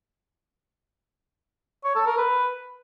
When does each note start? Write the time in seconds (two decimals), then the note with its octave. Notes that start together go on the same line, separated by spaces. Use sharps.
1.84 C#5
1.95 A4
2.07 A#4
2.18 B4